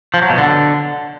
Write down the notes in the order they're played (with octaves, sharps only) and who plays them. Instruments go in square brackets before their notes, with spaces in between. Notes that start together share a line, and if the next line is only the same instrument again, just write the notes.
[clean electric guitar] F3
F#3
B2
D3